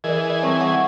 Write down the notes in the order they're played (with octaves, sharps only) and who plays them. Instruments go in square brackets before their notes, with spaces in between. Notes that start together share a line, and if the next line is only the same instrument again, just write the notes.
[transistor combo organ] E3 G#4 [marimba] A#4 [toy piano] D5 D#5
[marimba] G3 C4 [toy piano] C#5 A5 C#6
[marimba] F#5 [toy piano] C#6